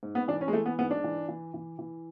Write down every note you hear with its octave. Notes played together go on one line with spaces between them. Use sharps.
G#2
B3
E3 D4
C#4
G#3
E3 A3
B3
G#2 B3
D4
E3
E3
E3
E3